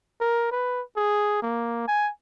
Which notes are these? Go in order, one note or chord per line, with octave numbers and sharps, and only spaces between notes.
A#4
B4
G#4
A#3
G#5